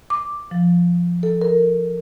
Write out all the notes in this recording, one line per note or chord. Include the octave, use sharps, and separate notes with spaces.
D6
F3
A4
A#4